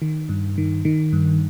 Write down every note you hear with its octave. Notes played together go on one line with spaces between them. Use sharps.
D#3
G2
D#3
D#3
G2